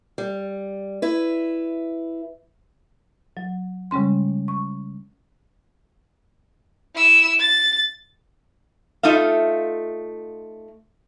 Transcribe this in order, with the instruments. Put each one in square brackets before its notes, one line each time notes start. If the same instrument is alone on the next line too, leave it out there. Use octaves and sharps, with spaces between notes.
[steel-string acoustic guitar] G3
E4 B4
[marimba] F#3
C#3 G3 G#3 C#4 C6
C#6
[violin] E4 E6
A6
[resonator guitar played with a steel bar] A3 D#4 F4 E5 F5